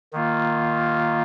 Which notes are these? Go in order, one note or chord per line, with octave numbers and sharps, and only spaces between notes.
D#3 A#3 F4